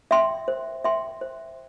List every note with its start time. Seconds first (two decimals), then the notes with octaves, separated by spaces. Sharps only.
0.11 E5 G5 C6
0.48 C5
0.84 E5 G5 C6
1.21 C5